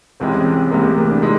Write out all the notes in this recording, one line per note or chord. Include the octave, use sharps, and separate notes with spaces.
C2 C3 E3 G#3 C4
C#4
C4
C2 C3 E3 G#3 A#3
A3
A#3
D4
C3 E3 G#3 D#4